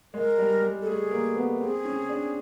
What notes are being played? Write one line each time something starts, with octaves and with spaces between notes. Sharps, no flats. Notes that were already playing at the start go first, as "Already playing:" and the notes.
G#3 A#4
G3
G3
A4
A3 G#4
A#3
B3
C4 G#4
C#4
D4